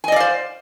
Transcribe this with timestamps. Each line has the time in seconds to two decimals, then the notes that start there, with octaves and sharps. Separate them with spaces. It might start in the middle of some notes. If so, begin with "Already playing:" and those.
0.04 G#5
0.08 D#5
0.12 D5
0.16 F5
0.20 C5